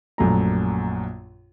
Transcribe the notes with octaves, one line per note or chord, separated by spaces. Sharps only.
A#1 F#2 A3 A#5